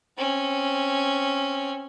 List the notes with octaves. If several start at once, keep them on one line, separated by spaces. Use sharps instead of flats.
C4 C#4